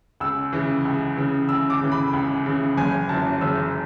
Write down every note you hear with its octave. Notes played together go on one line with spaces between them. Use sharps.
C#2 E6
C#3 E3
C#2
C#3 E3
C#2 E6
D6
C#3 E3
B5
C#2
C#3 E3
F#1 G#5
F#2 E3 A5
F#1 E6